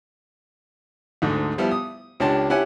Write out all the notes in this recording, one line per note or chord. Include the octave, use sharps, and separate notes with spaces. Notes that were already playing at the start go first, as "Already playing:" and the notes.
D2 G#2 D3
F3 G3 B3 E4
D#6
C#2 C#4 D4 G4 A5 C6
C#4 E4 G4 F#5 G#5